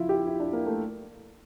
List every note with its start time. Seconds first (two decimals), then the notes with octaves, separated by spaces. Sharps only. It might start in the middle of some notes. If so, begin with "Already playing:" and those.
Already playing: F2 C#3 F3 E4 F4
0.09 G4
0.27 E4
0.40 D4
0.53 A#3
0.66 A3